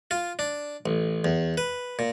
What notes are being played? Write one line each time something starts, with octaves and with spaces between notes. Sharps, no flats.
F4
D4
A1
E2
B4
A#2